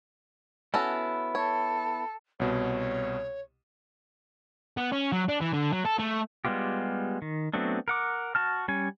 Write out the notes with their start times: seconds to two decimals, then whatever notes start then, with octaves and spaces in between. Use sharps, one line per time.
0.74 B3 C#4 E4 F#4 A4
1.35 A4 C#5
2.40 C2 B2 C#5
4.77 B3
4.92 C#4
5.12 F#3
5.29 D4
5.41 E3
5.53 D3
5.72 F#3
5.85 A4
5.99 A3
6.45 G3 G#3 B3 F4 G4
7.22 D#3
7.54 F#3 A3 B3 C4 D4
7.88 A#4 F#5 D6
8.35 F#4 A5 F6
8.68 G3 C#4 G#5